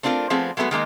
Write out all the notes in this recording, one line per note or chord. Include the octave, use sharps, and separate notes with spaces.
A3 C4 D4 F4 G#4 A#4
F3 A3 B3 C4 G#4
F#3 G#3 A3 B3 F#4
D#3 G#3 A#3 D#4